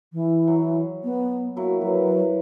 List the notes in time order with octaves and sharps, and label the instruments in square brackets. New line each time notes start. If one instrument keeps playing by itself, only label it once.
[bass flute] E3
[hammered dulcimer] F#3
[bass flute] B3
[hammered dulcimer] F#3 A#3 E4 [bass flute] F#4
[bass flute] F#3 [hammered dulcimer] B4